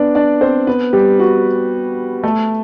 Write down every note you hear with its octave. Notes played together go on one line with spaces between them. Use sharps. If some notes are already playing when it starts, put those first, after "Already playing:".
Already playing: B3 D4 D5
D4 D5
C4 C5
B3 B4
G3 G4
F#4
A3 A4